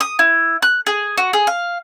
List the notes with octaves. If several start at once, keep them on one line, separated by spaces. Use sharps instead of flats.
D#6
E4
F#6
G#4
F#4
G#4
F5